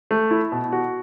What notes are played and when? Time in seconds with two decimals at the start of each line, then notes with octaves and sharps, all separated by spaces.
0.11 A3
0.31 E4
0.52 B2
0.72 F#4